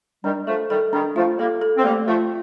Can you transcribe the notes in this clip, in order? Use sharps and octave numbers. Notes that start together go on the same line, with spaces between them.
D#3 G3 D4
F3 A3 A4
D#3 G3 A4
D#3 G3 D4
F3 A3 F4
G3 A#3 A4
A4
C4
G3 A3 A#3
F3 A3 F4